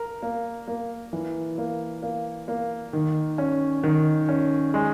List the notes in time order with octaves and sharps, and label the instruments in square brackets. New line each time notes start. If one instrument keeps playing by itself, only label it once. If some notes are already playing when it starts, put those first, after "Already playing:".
Already playing: [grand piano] A#4
A#3
A#3
E3
A#3
A#3
A#3
D#3
C#4
D#3
C#4
G#3